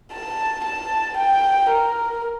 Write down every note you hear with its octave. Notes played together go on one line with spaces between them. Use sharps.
A5
A5
G5
A#4